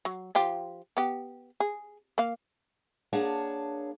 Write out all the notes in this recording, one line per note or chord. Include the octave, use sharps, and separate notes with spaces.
F#3
F3 F4 G4
B3 G4
G#4
A#3 F5
A#3 D4 G#4 C#5 F#5 A5